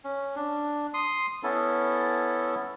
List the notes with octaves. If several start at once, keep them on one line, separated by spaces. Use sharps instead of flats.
C#4
D4
C6 D#6
B3 C#4 E4 A4